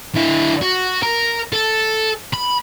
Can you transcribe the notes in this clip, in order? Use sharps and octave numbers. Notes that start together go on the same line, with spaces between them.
D3 E4
F#4
A#4
A4
B5